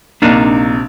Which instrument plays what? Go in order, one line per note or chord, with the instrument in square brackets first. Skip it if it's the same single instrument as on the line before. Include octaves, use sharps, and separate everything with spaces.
[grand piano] A#1 C3 [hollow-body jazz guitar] A#3 D4 D#4